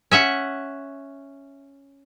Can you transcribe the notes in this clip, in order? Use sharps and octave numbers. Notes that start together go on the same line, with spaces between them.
C#4 E5 F#5